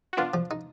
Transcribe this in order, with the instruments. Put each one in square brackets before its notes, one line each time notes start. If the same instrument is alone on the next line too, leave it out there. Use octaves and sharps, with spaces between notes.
[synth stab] F#4
[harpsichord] B3 [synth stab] D4 F4
[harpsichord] F3
D#4